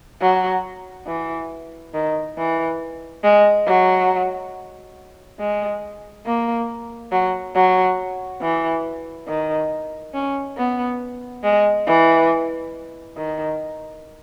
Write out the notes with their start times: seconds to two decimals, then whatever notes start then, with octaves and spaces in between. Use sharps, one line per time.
0.21 F#3
1.07 E3
1.94 D#3
2.37 E3
3.24 G#3
3.66 F#3
5.40 G#3
6.26 A#3
7.12 F#3
7.55 F#3
8.41 E3
9.28 D#3
10.14 C#4
10.57 B3
11.43 G#3
11.87 E3
13.17 D#3